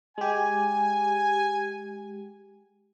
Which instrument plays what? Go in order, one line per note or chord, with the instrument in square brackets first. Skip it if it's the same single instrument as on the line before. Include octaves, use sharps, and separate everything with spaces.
[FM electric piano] G#3 G4 [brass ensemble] G#5